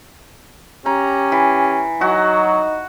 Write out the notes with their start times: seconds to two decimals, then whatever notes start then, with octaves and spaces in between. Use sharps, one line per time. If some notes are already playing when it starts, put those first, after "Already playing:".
0.86 C#4 G4 A#5
1.32 E3
2.01 F#3 D#4 F#4